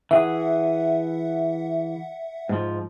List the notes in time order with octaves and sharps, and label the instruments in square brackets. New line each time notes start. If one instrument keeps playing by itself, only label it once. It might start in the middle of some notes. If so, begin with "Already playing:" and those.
[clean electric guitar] E3 G#4 [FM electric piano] E5 F#5
[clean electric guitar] G#2 F3